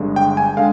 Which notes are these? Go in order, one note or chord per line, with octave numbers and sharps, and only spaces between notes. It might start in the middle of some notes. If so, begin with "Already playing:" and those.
Already playing: G1 G2 D3 G#3
G5
G#5
D3 G#3 F5